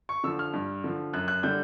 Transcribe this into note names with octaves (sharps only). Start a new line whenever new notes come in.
C#6
D3 F3 E6
F6
G2
D3 F3
F#2 F#6
F#6
D3 G3 G6